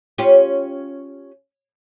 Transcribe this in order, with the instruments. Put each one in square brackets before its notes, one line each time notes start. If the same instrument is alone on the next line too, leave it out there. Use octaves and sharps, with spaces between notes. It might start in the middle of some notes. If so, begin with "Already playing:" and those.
[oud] C#4 F4 G4